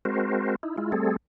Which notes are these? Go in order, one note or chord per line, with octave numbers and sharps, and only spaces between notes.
G#3 C4 F#4 A#4 C5
D#4 E4
G#3 E4 F4
G3 A3 C4 G#4 A4